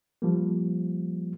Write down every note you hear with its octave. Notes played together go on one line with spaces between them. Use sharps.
F3 G3 A#3